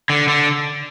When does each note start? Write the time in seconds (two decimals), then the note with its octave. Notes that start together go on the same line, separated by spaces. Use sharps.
0.10 D3
0.28 D3